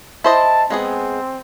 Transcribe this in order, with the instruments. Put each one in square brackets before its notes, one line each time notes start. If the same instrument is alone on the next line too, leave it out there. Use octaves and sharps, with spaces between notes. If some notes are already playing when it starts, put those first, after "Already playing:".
[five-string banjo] E4 C5 D#5 [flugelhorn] A5
[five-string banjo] G#3 B3 G#4 [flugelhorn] C4